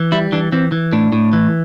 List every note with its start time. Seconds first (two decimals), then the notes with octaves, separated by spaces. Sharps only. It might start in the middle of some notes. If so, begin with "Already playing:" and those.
Already playing: E3
0.12 G3 E4
0.32 E3 D4
0.52 E3 C4
0.72 E3
0.93 A2 D4
1.12 A2
1.33 E3